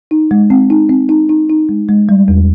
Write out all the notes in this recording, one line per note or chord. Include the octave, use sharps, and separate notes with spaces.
D#4
G#3
C4
D#4
C4
D#4
D#4
D#4
G#3
G#3
G3
E2